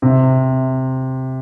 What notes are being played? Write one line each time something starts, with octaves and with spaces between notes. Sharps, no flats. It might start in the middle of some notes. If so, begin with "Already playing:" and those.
C3